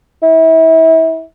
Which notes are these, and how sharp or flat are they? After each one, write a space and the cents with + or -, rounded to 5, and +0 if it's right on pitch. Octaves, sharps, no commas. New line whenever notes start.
E4 -30